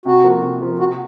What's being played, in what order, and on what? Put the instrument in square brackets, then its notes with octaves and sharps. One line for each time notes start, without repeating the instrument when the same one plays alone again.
[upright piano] C3 [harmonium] F#4
[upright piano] F3 A#3
C3
F3 A#3
[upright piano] C3 [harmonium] F#4